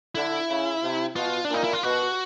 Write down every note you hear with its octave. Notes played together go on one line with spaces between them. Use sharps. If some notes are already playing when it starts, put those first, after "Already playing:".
D3 E4
C#3
C3
B2 F4
D4
A#2 D#4
E4
F4
B2 F#4